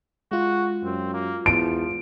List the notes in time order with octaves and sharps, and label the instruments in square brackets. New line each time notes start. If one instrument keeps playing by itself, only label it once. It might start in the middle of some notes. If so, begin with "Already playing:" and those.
[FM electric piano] G#3 F4 [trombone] F#4
[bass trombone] F#2 [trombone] C4
[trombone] A#3
[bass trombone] E2 [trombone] F3 [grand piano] D7